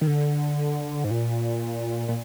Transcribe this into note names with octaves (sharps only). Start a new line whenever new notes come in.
D#3
D3
G#2
A#2
A#2